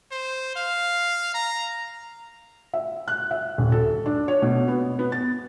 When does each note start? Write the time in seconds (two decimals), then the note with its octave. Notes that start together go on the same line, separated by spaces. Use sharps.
0.11 C5
0.56 F5
1.34 A#5
2.73 E5
3.08 F#6
3.31 E5
3.58 D#1
3.72 A4
4.06 D4
4.28 C#5
4.42 B2
4.68 B3
4.99 B3
5.12 A6